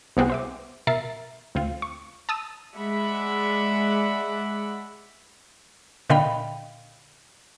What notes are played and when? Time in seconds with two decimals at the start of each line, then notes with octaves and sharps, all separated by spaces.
0.17 C2 B3 C4 F#4 G#4
0.30 C5 E5 D6
0.87 B2 A#4 E5 A6 C7
1.55 D2 C4 F4
1.82 C#6
2.29 A5 D#6 E6
2.75 G#3 D5 E5 F#5 B5
6.10 A#2 D3 D#5 F5 G5 B5